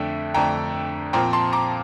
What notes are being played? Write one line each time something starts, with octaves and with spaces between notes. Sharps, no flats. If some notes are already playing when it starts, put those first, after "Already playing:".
Already playing: F2 D3 A3 D4 E5 G5
F2 D3 A3 D4 G5 A#5
A#2 F3 C4 G5 A#5
A5 C6
A#5 D6